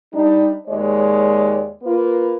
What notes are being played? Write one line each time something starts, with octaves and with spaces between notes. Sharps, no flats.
G3 D4 D#4
D#2 G#3 C#5 D5
A#3 F4 B4